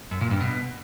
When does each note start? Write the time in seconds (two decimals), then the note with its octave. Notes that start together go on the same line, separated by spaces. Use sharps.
0.11 F#2
0.21 A#2
0.31 G2
0.41 B2